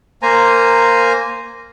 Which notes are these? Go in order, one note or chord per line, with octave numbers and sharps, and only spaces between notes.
A#3 C5 G#5 A#5